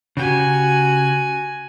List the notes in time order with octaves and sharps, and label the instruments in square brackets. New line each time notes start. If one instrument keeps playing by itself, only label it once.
[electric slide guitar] C#3 G4 [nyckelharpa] F#4 G#5